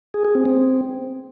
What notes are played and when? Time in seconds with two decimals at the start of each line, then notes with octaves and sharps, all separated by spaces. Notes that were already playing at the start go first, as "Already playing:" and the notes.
0.14 G#4
0.25 G#4
0.35 C4
0.45 C4